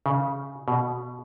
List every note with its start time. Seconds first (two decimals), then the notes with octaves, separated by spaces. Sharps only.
0.06 C#3
0.68 B2